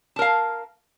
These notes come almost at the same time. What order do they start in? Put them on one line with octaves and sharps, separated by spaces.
A5 A#4 F5